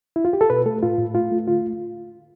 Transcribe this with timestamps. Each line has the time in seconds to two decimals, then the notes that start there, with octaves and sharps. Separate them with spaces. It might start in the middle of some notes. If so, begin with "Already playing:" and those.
0.16 E4
0.25 F4
0.33 G4
0.41 A4
0.50 B2 B4
0.66 A3 A4
0.83 A2 F4
0.98 A2
1.15 A3 F4
1.32 A3
1.47 D3 F4